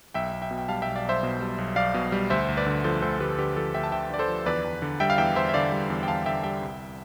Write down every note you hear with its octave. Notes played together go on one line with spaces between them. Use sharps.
B1 E5 G5
B1
E5 G5
B2
G5
G3 F5 A5
E5 G5
B1
D5 F5
B1 C5 E5
B2
G3
B1
B1 D5 F5
B2
G3
D2 C5 E5
D2
B4 D5
D3
F3 A4 C5
D2 A4 C5
D2 G4 B4
D3 G4 B4
F3 A4
D2 E5 G5
A5
D2 E5 G5
D3 D5
A4 C5
F3
E2 B4 D5
E2
D3
G3 E5 G5
F5
E2 E5 G5
E2 C5 E5
E5
D3 D5 F5
G3
E2
G5
E2 F5 A5
D3 E5 G5
G3 E5 G5
C2